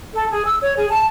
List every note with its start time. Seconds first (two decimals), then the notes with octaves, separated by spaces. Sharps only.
0.14 A4
0.31 G#4
0.46 E6
0.61 C#5
0.76 G#4
0.91 A5